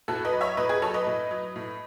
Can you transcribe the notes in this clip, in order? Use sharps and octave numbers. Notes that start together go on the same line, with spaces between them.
A2 F#4 A4
B4 D#5
F#3
C#5 E5
A2 B4 D#5
G#4 B4
F#3 A4 C#5
B4 D#5
A2
F#3
A2